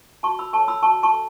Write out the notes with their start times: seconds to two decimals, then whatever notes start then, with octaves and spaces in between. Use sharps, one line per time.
0.23 F#4 A5 C#6
0.39 B5 E6
0.53 A4 C#5 A5 C#6
0.68 B5 E6
0.83 F#4 A5 C#6
1.03 A5 C#6
1.12 A4